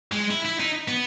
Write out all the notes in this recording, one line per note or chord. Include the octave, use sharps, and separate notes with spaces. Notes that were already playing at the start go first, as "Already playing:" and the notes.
G#3
E4
E4
D#4
B3